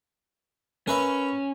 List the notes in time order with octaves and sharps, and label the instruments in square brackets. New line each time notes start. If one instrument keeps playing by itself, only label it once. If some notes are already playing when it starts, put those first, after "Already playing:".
[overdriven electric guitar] C#4 [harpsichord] A#4 B4 E5